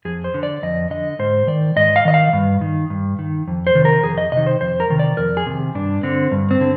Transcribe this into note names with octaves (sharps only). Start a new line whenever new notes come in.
F2 G#4
C5
D3
D5
F2 D#5
D3 D#5
G#2 C5
D#3 D5
G#2 D#5
F5
D#3 D#5
F5
G2
D#3
G2
D#3
F2
C5
C3 D#3
A#4
F2 G#4
D#5
C3 D#3 D#5
C5
F2 C5
A#4
C3 D#3
D5
F2 A#4
G#4
C3 D#3
G2 D4
D3 C4
G2
C4
D3